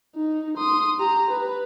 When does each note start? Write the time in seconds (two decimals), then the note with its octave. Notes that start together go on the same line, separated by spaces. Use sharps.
0.15 D#4
0.57 C6 D#6
1.00 G4 A#5
1.30 B4